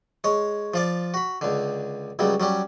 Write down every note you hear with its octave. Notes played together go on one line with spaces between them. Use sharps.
G#3 C#5
F3 F4 D5
F#4 B5
C#2 D3
C#2 C#3 F#3 G3
F#3 G3 C#4 G4